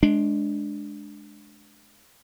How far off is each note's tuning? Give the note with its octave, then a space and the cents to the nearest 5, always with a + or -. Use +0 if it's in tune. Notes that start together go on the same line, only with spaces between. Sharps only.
G#3 +20 D4 +0